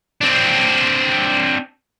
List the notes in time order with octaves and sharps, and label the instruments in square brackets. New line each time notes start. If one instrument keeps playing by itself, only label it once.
[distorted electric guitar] C4 D4